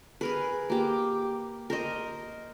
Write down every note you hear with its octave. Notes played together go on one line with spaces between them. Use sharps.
G#4 A#4 B4
A#3 G4
A#4 C5 D#5